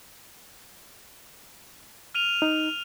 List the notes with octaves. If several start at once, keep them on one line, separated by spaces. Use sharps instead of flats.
F6 D#7 F7
D#4